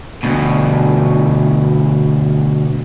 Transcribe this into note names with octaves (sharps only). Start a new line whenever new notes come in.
D2 B2